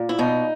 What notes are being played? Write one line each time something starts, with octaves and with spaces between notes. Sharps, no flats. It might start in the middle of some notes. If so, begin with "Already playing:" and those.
Already playing: A#2
E4
B2 D#4